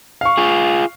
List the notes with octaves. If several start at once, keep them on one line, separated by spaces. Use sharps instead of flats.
F5 C#6
F4 G#4